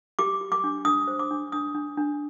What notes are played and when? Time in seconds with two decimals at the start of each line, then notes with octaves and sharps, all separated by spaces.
0.19 G4 D6
0.41 G4
0.52 D6
0.64 D4
0.85 D4 D#6
1.08 C5
1.19 D6
1.31 D4
1.52 D4 D#6
1.75 D4
1.97 D4